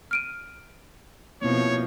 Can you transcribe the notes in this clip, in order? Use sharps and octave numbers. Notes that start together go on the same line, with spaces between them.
F6 D7 D#7
B2 F3 A#3 C4 E4 C#5